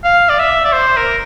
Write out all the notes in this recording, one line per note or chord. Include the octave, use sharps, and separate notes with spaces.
F5
D5
E5
D5
C5
A#4